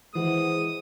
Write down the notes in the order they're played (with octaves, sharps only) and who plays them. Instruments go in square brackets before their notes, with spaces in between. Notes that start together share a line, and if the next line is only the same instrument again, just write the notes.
[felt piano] E3 [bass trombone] G#3 [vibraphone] C5 F#5 [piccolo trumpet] D#6